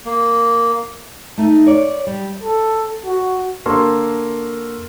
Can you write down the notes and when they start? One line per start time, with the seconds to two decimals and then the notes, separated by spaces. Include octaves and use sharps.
0.05 A#3
1.38 A3 D#4
1.66 C#5 D5
2.07 G3
2.44 A4
3.05 F#4
3.66 D3 A#3 A4 A#4 C6 C#6